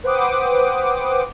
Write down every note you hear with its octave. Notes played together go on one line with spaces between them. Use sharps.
B4 C5 F#5 G5 D6 D#6